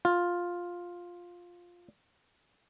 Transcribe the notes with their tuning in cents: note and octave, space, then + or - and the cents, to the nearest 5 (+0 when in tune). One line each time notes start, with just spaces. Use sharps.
F4 +5